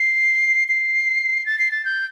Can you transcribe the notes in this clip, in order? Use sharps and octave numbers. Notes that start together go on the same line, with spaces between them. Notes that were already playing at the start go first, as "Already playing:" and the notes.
Already playing: C7
C7
A6
C7
A6
G6